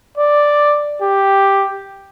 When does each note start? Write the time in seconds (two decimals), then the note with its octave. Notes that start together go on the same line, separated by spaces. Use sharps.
0.18 D5
1.02 G4